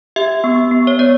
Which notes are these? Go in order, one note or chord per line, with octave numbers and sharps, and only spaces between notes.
G4 E5
B3
B3
C#5
B3 D5